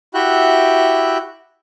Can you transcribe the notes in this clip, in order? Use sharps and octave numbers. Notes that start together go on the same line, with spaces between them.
E4 F#4 G4 E5 G5 F#6